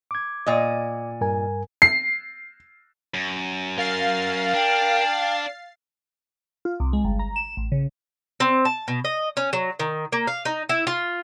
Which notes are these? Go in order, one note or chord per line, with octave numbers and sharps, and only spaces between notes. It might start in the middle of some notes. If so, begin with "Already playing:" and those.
D6 G#6
A#2 D5 D#5
G2 A#4 G#5
C7
F#2
A#4 F5 A6 C7
D4 G5
F4
C2
G#3
G1
A#5
E7
A1
C#3
C4
A5
B2
D#5
C#4
F#3
D#3
A#3
F5
D#4
E4
F4